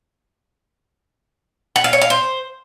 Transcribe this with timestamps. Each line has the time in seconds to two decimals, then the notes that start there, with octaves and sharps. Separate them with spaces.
1.76 F#5
1.84 F5
1.93 C#5
2.02 F5
2.10 C5